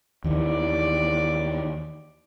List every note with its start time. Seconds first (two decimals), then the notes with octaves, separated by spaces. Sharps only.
0.24 D#2 D#3 E3 D5